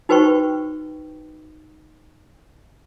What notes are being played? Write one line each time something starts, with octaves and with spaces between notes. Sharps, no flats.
D#4 F#4 B4 C5 G5 C#6